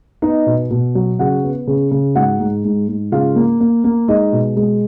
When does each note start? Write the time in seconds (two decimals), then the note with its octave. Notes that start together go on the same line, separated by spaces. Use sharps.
0.22 B3 D#4 D#5
0.46 B2
0.71 B2
0.95 F#3
1.19 C#3 F#4 F#5
1.44 B3
1.67 C#3
1.91 C#3
2.15 G#2 F#4 F#5
2.40 G#2
2.64 G#2
2.88 G#2
3.12 C#3 F4 F5
3.36 A#3
3.60 A#3
3.84 A#3
4.08 G#3 D#4 D#5
4.32 B2
4.57 G#3